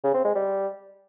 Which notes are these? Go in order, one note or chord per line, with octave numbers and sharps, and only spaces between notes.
C#3
C4
G#3
G3